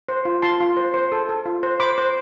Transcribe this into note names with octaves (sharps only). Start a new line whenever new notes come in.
C5
F4
F4 A5 C6
F4
C5
C5
A4
A4
F4
C5
C5 B5 D6
C5